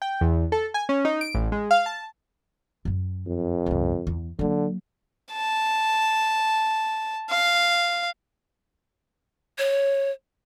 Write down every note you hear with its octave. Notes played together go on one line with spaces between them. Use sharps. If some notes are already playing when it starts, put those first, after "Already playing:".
G5
E2
A4
G#5
C#4
D#4
D7
A1
G#3
F5
A5
F#2 C#4
F2
C#2 G2
E2
D3 F#3 A#3
A5
F5
C#5